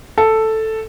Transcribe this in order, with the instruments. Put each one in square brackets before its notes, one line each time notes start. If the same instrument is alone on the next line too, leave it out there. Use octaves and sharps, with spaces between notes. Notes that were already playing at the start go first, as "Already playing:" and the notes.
[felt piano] A4